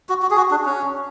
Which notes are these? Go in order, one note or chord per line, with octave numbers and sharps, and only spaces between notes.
F#4
F#4
G#4
F#4
D4
C#4